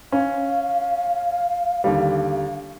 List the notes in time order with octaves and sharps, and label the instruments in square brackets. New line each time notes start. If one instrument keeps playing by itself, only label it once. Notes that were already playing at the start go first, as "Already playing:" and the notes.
[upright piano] C#4 [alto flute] F5
[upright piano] D#2 D3 G3